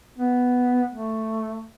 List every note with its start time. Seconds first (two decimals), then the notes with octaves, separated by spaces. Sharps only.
0.18 B3
0.91 A3